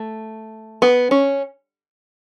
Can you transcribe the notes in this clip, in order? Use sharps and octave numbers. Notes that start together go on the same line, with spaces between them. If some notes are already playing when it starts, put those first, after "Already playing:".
Already playing: A3
B3
C#4